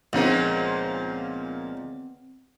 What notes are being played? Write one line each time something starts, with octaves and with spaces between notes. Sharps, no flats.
C#2 A#2 F3 B3 C4 D#4